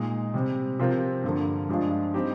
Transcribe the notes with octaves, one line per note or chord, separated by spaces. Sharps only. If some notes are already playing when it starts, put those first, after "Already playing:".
Already playing: A#2 G#3 D#4
C3 G3 C4
C3 F3 C4 F4 A#4
G2 D3 F3 A#3
G2 F3 G#3 D4 F4
G3 C4 D#4 G4